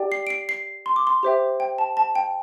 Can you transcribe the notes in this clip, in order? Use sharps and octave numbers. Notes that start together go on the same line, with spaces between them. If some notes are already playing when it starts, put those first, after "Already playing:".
Already playing: G4 D5 G5
C7
D7
C7
C7
C6
D6
C6
G4 C5 E5 G5
G5
A5
A5
G5